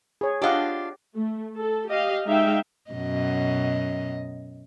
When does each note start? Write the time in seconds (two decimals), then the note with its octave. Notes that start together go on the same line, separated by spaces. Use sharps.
0.21 G#4 C#5
0.42 D4 F4 G4 D#5 F#5
1.16 A3
1.56 A4
1.88 G4 D#5 F5
2.27 G#3 D#4 E5 F5 G5
2.91 F#2 B2 D#5